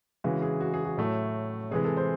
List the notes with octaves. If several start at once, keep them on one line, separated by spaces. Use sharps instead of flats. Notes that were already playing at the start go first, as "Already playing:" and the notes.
C#3 E3 G#3 F#4
G#4
F#4
G#4
F#4
A2 F#3 A3
C3 E3 G#3 G#4
A4
C5